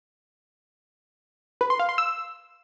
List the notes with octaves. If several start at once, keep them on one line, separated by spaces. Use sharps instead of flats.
B4
C6
F5
C6
E6